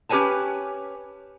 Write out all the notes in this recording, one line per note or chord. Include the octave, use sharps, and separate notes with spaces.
C#4 G4 B4 C#5 G#5 A5